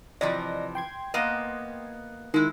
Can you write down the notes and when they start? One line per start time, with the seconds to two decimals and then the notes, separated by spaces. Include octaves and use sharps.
0.21 C3 E3 F3 D5 D#5 A#6
0.75 G5 C6 G#6
1.14 A#3 B3 D#5
2.34 D#3 G#3 E4